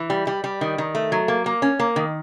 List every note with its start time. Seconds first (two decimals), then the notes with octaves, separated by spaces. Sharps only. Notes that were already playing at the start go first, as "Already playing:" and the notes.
Already playing: E3
0.10 G3
0.27 G3
0.44 G3
0.61 D#3
0.78 D#3
0.95 A3
1.12 F#3
1.28 A#3
1.46 A#3
1.62 C#4
1.80 A#3
1.96 D#3